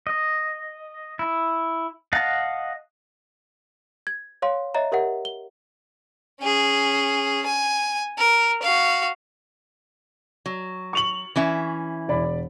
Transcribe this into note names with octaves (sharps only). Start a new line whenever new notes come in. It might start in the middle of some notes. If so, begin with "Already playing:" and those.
D#5
E4
D#5 F5 F#5 A5
G#6
C#5 F5 C6
C#5 D#5 E5 A#5
G4 A#4 E5 F#5
G7
C#4 G#4
G#5
A#4
F#4 F5
F#3
C#6 F7 F#7
E3 C#4 E5
E1 D5 B5